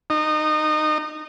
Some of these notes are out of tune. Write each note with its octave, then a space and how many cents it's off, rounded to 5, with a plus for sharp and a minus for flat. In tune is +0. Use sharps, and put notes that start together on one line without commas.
D#4 -25